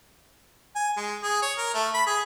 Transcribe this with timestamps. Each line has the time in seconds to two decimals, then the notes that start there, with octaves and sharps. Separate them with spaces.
0.76 G#5
0.97 G#3
1.23 G#4
1.43 C#5
1.58 A#4
1.74 A3
1.94 B5
2.07 G#4